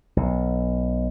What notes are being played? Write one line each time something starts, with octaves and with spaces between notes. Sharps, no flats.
B1